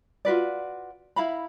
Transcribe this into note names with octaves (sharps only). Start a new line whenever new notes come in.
F4 F#4 B4 D5
E4 F5 A#5 B5